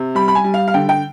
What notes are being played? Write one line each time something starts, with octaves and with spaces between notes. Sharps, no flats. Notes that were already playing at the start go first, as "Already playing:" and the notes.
Already playing: C3
G3 B5
B5
G#5
G3
F5
F5
D3 G5
G5